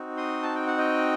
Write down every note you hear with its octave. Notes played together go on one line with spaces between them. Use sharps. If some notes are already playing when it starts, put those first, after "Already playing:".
Already playing: C4 D#4 F#4
C6 D#6
A5
G5
F#5
D#5 G5